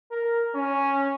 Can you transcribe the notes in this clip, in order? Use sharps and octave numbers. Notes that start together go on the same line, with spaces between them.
A#4
C#4